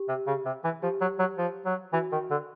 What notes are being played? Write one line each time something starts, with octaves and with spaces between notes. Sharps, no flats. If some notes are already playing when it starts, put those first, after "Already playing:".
Already playing: G4
C3
C#3
C3
E3
F3 G4
F#3
F#3
F3
F#3
E3 F#4
D#3
D3